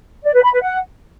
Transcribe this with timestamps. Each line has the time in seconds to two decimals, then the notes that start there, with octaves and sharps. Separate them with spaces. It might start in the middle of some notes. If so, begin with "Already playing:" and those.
0.24 D5
0.34 B4
0.43 B5
0.52 B4
0.62 F#5